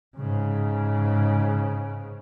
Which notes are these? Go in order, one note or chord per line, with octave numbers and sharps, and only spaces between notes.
G#2 C#3